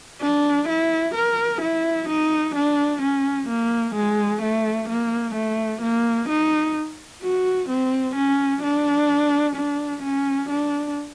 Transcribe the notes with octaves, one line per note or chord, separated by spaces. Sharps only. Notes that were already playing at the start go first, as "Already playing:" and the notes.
D4
E4
A#4
E4
D#4
D4
C#4
A#3
G#3
A3
A#3
A3
A#3
D#4
F#4
C4
C#4
D4
D4
C#4
D4